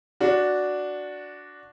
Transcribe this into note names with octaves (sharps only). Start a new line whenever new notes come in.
D4 F#4